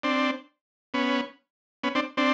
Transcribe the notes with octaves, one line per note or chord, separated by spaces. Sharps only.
C4 D4
B3 C#4
B3 C#4
C4 D4
C4 D4